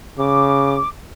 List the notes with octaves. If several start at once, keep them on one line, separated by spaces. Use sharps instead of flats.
C#3 D6